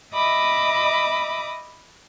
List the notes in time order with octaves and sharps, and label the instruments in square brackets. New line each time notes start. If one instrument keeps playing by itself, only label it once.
[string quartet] D#5 E5 B5 D6 D#6